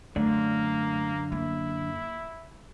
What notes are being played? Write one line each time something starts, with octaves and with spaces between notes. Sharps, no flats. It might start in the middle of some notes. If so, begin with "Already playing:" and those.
F#2 D3 A3 A#3 D5
A#3 E4